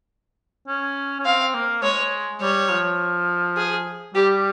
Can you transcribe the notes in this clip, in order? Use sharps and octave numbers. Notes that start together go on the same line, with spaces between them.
C#4
C#4
C4 F5
A#3
G#3 C#5
G3 C#5
F3
G#4
G3 G4